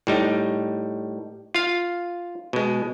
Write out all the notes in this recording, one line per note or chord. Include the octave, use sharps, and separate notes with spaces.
A2 G3 D#4
F4 F5
B2 G#3